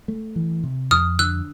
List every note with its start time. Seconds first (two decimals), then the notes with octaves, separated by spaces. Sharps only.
0.08 A3
0.36 E3
0.64 C3
0.91 F2 D#6 F6
1.19 D3 E6 F#6